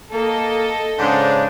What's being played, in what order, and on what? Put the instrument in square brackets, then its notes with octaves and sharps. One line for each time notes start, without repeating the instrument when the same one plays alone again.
[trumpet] A#3 [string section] A4 D#5
[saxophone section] G#2 [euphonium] C#3 [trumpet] D4